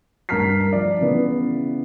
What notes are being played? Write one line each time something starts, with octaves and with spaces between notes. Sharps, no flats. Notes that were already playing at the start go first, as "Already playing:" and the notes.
G2 A#4 A#5 F6 B6 C7
F3 D5
C#3 E3 B3